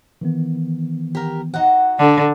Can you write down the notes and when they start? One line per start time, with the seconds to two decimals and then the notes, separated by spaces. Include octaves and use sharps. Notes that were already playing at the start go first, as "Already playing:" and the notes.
0.21 D#3 E3 B3
1.15 G4 A#4
1.54 D#4 F#4 F#5
1.99 D3